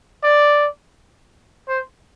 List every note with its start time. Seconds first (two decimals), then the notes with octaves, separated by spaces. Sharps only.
0.23 D5
1.68 C5